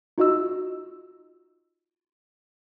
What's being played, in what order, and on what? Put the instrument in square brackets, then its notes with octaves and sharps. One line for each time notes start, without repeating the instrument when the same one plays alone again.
[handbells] D#4 F4 F#4 D#5 E6